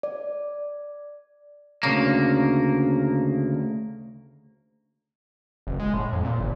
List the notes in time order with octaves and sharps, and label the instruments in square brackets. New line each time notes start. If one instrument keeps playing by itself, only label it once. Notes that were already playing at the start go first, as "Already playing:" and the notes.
[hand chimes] D5
[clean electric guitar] D2 C#3 A#3
[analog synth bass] F#1
G#3
A2
F2
A#2
G1